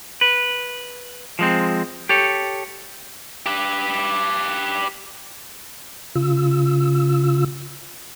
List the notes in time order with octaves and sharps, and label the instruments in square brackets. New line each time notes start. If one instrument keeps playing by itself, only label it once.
[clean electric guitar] B4
F3 G#3 C4
G4 A4 C#5
[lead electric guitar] G4 B4
[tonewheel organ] C#3 F4 E6